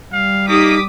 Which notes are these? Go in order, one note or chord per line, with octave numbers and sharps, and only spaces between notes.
G3 F5
A#3 D#4 G4 D6 D#6 B6